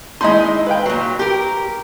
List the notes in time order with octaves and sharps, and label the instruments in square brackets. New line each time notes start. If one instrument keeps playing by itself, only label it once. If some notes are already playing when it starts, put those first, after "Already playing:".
[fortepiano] G#3 B5 C6 [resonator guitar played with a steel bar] D#4 E4 D#5
[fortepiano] B4 F5 G5
[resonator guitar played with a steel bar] A#2 F#3
G4 A#4